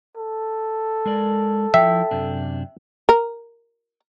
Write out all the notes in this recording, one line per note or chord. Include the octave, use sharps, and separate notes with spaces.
A4
G#3 A#4 D5
F3 E4 E5 G5
F#2 C3 D4
A#4